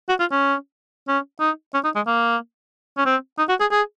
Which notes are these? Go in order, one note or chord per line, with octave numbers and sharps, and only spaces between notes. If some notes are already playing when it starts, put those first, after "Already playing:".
F#4
F4
C#4
C#4
D#4
C#4
D#4
G#3
A#3
C#4
C4
D#4
F#4
G#4
G#4